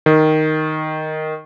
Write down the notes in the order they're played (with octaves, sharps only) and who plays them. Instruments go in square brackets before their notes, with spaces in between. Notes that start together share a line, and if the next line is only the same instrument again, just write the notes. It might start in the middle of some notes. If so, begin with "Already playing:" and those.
[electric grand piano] D#3